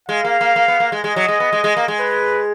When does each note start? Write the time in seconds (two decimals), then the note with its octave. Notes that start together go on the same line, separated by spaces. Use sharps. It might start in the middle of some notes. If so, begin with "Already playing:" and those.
0.09 G#3 F5
0.24 A#3
0.41 A#3
0.56 A#3
0.68 B3
0.80 A#3
0.92 G#3
1.04 G#3 D#5
1.16 F#3
1.28 G#3
1.40 B3
1.53 G#3
1.64 G#3
1.77 A#3
1.88 G#3
2.00 B4